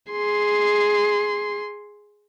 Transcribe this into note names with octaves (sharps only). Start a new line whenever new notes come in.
G#4 C6